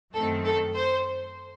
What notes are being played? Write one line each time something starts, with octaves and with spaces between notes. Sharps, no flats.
F#2 D#3 A3 C4 A4
A4
C5